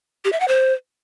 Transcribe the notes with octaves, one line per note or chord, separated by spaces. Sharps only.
G4
E5
F#5
C5